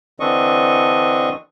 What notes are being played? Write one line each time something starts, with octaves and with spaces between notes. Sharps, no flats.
D3 E3 C4 D4 D#5 C#6